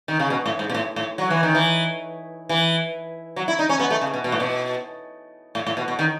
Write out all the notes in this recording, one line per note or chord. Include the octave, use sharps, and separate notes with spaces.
D#3
C#3
B2
A2
G#2
B2
A2
A2
F#3
E3
D#3
E3
E3
F#3
E4
D#4
C#4
B3
A3
C#3
B2
B2
A2
B2
A2
A2
B2
B2
D#3